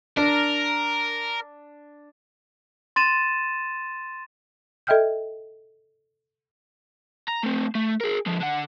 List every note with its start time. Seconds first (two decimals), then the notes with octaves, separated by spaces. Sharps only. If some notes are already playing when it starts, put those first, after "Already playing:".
0.17 D4 A#4
2.96 C6 A6 D#7 E7
4.87 A4 D#5 E5 G5 F6 G6
7.28 A#5
7.43 A3 C4
7.75 A3
8.00 G#4 A#4
8.26 D3 F3
8.41 D3 F#5